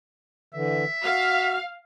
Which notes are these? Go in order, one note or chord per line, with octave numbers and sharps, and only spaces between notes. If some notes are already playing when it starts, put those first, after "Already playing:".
D3 E3 E5
F#4 F5